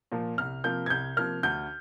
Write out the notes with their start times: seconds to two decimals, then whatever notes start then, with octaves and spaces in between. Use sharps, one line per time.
0.12 A#2 F3 A#3
0.38 C2 F6
0.64 C3 F3 A#3 G6
0.86 G#6
0.90 C2 G6
1.17 C3 F3 A#3 F6
1.43 D2 G6